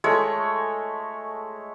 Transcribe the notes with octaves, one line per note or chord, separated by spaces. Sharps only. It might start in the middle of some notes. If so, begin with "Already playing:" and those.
G#3 A3 C#5